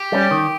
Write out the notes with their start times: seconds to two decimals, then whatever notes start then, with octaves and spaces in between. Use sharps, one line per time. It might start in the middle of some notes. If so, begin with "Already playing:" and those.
Already playing: G4
0.12 G3 C#4
0.31 D#3